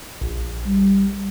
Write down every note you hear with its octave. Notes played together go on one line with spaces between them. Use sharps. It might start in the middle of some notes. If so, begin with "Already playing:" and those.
A#1
G3